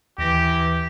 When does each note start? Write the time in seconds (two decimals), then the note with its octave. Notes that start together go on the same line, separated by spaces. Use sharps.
0.18 D#2 E3 G4 A#6